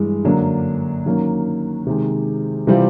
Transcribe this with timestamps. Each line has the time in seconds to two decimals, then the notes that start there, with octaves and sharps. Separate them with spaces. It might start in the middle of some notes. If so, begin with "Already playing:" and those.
Already playing: G2 E3 G#3
0.25 F#2 D3 F#3 A#3 D4
1.05 D#3 F#3 A#3 C#4
1.87 C3 D#3 G#3
2.67 C3 E3 G3 C4 F4